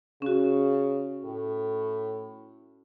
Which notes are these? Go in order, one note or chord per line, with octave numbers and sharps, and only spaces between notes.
C#3 C#4 F#4
A2